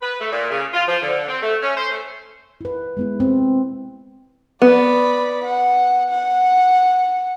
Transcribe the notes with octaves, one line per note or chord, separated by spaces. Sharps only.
B4
A3
A#2
C#3
F4
F3
D3
C4
A3
C#4
C5
A3
E4 B4
G#3 B3 E4
C4
B3 D5 B5
F#5
F#5